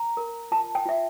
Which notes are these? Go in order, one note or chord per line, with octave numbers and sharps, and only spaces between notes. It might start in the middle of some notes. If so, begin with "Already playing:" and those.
Already playing: A#5
A#4
F4 A5
G5
F4 E5